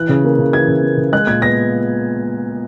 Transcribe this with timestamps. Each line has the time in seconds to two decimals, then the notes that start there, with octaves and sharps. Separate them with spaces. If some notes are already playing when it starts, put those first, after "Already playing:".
Already playing: E3 F#6
0.09 C#3
0.24 A#3
0.39 C#3
0.53 E3 G#6
0.68 C#3
0.83 A#3
0.97 C#3
1.13 G#3 F#6
1.27 A#2 G#6
1.42 B3 A#6